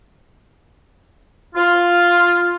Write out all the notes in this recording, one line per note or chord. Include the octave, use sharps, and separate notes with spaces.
F4